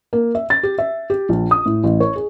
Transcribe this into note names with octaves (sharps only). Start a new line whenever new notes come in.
A#3
E5
A6
G4
E5
G4
A#1
D#6
A2
A1
C#5
G#4